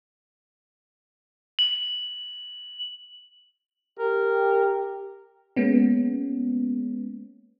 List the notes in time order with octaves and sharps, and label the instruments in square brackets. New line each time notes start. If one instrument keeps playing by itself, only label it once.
[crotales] F#7
[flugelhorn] G4 [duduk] A#4
[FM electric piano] G#3 A#3 B3 C#4